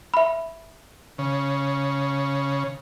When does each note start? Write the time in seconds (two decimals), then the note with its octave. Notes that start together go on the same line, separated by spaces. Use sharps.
0.14 E5 B5
1.18 C#3